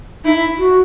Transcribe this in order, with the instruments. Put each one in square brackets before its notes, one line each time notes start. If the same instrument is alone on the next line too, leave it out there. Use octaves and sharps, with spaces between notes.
[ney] D#4 [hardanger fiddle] E4
[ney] F#4